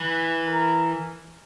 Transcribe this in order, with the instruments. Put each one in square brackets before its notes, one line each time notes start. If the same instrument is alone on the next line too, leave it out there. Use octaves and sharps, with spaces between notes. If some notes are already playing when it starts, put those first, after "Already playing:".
Already playing: [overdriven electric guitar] E3 [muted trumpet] B4
[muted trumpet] A#4